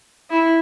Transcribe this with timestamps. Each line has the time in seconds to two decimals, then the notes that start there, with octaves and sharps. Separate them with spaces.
0.30 E4